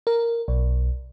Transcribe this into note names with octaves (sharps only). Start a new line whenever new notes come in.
A#4
B1